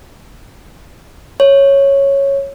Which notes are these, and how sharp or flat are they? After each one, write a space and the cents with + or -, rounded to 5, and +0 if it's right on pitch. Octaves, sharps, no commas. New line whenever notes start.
C#5 -5